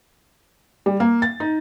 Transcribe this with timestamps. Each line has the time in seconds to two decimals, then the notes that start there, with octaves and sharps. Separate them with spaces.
0.86 G3
1.00 A#3
1.22 A6
1.40 D#4